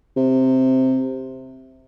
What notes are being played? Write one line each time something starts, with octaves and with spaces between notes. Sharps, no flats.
C3